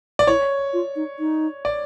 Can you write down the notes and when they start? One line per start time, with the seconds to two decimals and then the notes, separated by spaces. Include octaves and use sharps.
0.19 D5
0.27 E4 C#5
0.73 F4
0.96 D#4
1.19 D#4
1.65 D5